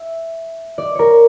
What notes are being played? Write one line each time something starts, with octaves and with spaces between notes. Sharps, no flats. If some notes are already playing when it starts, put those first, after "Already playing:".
Already playing: E5
D5
A#4 C#5